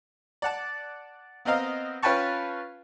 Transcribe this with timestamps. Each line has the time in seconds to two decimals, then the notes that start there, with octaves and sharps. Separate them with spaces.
0.42 D5 F#5 A5
1.45 B3 C4 A#4 D#5 F5
2.03 C#4 F4 B4 G5 A5 C#6